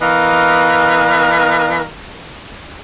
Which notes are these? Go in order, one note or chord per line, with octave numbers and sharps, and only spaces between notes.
E3 B3 A#4 D#5 F5